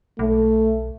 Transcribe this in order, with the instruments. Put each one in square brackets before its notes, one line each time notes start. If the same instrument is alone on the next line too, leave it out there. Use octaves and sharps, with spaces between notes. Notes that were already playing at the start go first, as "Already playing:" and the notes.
[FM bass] B1 [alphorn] A3